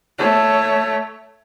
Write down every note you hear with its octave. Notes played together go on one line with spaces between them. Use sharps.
A3 C#5